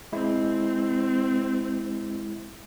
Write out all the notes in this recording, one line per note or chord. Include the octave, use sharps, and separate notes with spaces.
G#3 C4 E4